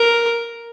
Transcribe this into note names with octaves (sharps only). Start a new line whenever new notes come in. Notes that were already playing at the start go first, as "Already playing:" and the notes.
Already playing: A#4